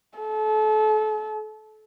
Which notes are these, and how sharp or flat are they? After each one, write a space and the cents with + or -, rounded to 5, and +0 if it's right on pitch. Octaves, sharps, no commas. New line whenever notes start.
A4 -35